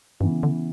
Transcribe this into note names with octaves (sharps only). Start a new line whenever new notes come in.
G2 C#3 E3 B3
D3